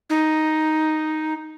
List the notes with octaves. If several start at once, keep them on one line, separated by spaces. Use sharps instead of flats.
D#4